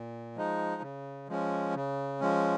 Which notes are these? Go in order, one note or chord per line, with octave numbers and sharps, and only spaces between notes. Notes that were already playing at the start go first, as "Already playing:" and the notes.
Already playing: A#2
F3 G#3 D#4
C#3
F3 G#3 C#4
C#3
F3 G#3 C#4